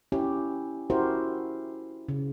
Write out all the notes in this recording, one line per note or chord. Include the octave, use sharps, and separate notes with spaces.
C#4 E4 G4
C#4 E4 F#4 G4 A#4 C5
C#3